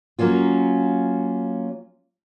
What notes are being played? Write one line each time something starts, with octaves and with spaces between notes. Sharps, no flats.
F#3 A#3 C#4 F4